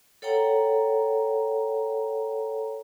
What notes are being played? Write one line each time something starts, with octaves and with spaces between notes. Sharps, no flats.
A4 C#5 F#5 G5 A#5